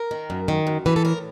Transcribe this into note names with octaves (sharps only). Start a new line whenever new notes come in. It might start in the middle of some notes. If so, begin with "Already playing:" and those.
Already playing: A#4
D#3
F#2
D#3
F#2
E3 B4
A4
A2 A#4